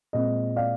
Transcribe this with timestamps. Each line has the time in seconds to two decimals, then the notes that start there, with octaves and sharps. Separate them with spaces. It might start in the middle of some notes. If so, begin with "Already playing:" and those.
0.13 A#2 G#3 C4 D#5
0.56 D5 F5